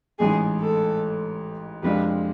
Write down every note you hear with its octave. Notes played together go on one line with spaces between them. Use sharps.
A1 G#2 E3 G#4
A4
F2 C3 G#3 D4 F4 B4